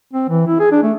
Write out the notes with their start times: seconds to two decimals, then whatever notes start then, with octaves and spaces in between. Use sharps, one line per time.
0.13 C4
0.29 E3
0.47 E4
0.60 G#4
0.72 D4
0.83 A3